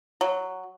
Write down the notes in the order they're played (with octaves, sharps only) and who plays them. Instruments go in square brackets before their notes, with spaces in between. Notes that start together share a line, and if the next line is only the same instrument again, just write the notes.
[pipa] F#3